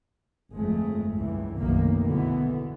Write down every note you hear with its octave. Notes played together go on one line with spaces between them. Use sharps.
G1 F2 G#3 A3
C#2 G2 E3
F1 B1 F#2 A2 D#3 A#3
B2 D3 E3 B3